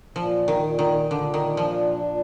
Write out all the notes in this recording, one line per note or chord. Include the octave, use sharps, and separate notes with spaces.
A#2 F3
D#3
A#2
D#3
A#2 D3
D#3
F3 D4
A#2